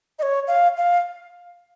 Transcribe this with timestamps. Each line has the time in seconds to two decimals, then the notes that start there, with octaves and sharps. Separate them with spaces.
0.19 D#5
0.22 C#5
0.47 F5
0.77 F5